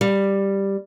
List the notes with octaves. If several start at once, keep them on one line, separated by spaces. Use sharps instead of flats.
G3